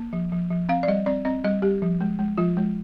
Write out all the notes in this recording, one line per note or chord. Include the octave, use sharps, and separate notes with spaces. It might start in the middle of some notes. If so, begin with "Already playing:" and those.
Already playing: A#3
F3
F3
F3
C4 F5
D5
G3 D#5
C4 D5
C4 D#5
G3 D#5
G3 G4
F3
G#3
G#3
F3 F4
G#3